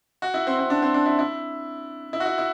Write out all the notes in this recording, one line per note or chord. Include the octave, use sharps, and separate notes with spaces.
F#4
E4
C4
C4
D4
C4
D4
E4
E4
E4
F#4
E4
E4